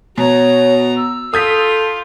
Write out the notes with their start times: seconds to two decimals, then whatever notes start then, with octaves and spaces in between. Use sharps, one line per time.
0.18 B2 F#4 C#5 A#5
0.96 E6
1.34 F4 A4 D#6 G6 B6